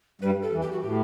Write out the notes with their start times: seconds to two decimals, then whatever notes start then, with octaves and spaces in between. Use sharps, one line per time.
0.21 G2 G3 B4
0.42 A4
0.52 E2 E3
0.62 G4
0.72 F#4
0.82 A2 G4